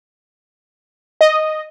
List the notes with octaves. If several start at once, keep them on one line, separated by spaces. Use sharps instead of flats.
D#5